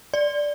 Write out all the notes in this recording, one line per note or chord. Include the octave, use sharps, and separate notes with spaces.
D5